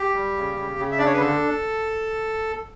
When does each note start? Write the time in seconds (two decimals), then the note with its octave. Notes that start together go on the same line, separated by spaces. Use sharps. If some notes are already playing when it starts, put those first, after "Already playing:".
Already playing: G4
0.14 G3
0.36 C#3
0.56 C#3
0.78 C#3
0.92 E5
0.98 D4 D5
1.06 C#5
1.13 B4
1.19 D3 A4